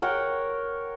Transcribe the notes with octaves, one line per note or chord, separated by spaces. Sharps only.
A#4 C#5 F#5 G5